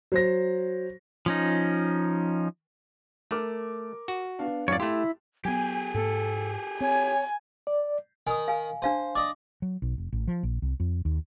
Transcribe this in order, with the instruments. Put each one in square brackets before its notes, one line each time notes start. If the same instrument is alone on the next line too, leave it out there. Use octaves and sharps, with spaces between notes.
[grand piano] F#3 C5 A#6
[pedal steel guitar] F3 C#4 D#4
[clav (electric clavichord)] A3 [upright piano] A#4 D6
[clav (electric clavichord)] F#4
[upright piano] B3 D4 F5
[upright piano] G#1 A2 F5 [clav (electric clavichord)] F#2 [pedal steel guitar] C#5 D5
[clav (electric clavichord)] A3 G4 [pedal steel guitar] E4 [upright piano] C6
[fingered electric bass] F#3 B3 [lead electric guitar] G4 G#4 [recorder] G#5
[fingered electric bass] G#2 A#3 [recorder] A4
[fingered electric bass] C4 [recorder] C#5 [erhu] G#5
[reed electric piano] D5
[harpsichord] D#3 D#6 [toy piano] G#5
[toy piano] F5 G#5
[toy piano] D4 F5 A5 [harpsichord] C5
[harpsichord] D5 D#5 [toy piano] D6
[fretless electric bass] F#3
B1
F1
A1
F3
A#1
C2
F2
D#2